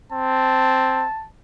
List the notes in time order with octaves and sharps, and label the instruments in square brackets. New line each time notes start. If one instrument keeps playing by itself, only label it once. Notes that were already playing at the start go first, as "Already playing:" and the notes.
[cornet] C4 [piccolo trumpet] A5